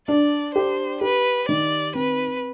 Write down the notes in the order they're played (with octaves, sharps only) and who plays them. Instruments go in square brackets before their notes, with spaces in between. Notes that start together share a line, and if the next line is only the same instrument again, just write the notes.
[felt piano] D4 [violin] D5
[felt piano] G4 [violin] C5
[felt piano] G4 [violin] B4
[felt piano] D#3 [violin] D5
[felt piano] C4 [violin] B4